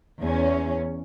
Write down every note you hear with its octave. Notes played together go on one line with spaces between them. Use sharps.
E2 C#4